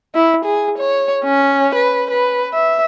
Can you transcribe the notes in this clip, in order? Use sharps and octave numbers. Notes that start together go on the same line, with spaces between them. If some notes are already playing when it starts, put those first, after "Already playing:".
E4
G#4
C#5
C#4
B4
B4
E5